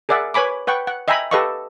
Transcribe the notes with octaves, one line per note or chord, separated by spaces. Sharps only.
G#4 A#4 D5 E5 F#5
B4 C#5 G#5 B5 D6
B4 F#5 G5 C#6
F#5
D#5 E5 G5 G#5 A#5 B5
G4 A4 B4 D#5 F5 C#6